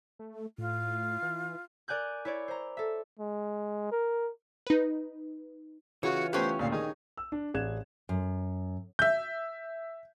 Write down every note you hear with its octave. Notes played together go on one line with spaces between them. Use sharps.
A3
A2 F4
E3
A#4 D5 G#5 F#6 G6
E4 C#5 D5
C5 A#5
A4 E5
G#3
A#4
D#4 B4
C#3 E3 F4 F#4 C#5
A3 B3 C#4 G4 C5 F#6
D2 A#2 F5
D#3 D#4 G#4
E6
D4
A1 G#4 D5 F#6 G#6 E7
F#2
E5 G6